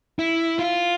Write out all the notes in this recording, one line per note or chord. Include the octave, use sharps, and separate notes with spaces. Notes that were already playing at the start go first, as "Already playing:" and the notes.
E4
F4